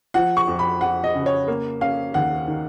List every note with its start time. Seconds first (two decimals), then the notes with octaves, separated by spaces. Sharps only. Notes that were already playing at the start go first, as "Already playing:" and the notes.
0.14 F3 F#5
0.37 C#6
0.48 F2
0.59 B5
0.81 F2 F#5
1.04 D#5
1.15 C#3
1.26 C#5
1.48 A#3
1.81 C#4 F5
2.14 D#2 F#5
2.48 D#3